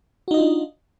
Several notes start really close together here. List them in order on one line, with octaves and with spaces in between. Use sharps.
F#4 D#4 D#5 F4 D4